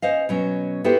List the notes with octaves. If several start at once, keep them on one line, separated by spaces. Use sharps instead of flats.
C#4 C5 D#5 F5
B2 F#3 C#4
B3 E4 F#4 G4 A4 C5